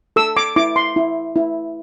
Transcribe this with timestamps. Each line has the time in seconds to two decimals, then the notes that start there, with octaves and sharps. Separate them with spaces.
0.16 A4 E6
0.37 D6
0.56 E4 D6
0.76 C6
0.96 E4
1.36 E4